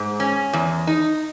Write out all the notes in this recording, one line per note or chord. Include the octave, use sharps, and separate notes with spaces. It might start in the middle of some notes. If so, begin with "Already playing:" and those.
Already playing: G#2
C#4
E2
D#4